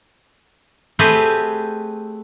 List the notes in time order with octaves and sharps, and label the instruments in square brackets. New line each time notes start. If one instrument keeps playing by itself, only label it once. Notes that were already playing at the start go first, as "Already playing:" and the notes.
[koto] A3 C4 G4 G#4 B4